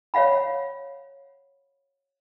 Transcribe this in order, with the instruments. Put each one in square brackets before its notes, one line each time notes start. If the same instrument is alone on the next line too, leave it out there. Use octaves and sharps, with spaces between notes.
[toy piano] C#5 D5 F5 F#5 B5